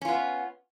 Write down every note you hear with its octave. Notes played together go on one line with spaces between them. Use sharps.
B3 C#4 F4